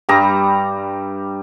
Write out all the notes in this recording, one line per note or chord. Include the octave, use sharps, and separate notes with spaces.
G2 G3 A#5